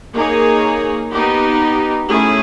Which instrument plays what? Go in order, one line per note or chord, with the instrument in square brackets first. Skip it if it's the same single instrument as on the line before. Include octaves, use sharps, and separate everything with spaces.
[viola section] A#3 D#4 G#4 C#5
B3 D#4 G4
A3 C#4 E4 G#4